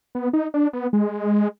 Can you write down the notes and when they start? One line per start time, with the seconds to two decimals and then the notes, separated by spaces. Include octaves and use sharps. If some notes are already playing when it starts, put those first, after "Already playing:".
0.15 B3
0.33 D#4
0.54 D4
0.73 B3
0.93 G#3